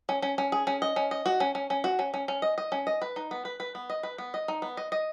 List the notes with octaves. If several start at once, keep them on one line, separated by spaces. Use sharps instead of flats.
C#4
C#4
C#4
G#4
C#4
D#5
C#4
D#5
F#4
C#4
C#4
C#4
F#4
C#4
C#4
C#4
D#5
D#5
C#4
D#5
B4
D#4
B3
B4
B4
B3
D#5
B4
B3
D#5
D#4
B3
D#5
D#5